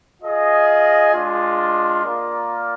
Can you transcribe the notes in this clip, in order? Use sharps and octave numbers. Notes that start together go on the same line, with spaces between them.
F4 G#4 D#5
G#3 D4 F4
A#3 F4 A#4 D5